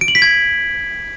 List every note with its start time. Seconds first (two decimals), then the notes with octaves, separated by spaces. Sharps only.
0.01 D7
0.08 F#7
0.15 B6
0.22 G#6